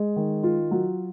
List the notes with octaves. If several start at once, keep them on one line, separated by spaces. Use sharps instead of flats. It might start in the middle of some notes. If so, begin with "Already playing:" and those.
Already playing: G#3
D#3
F4
F#3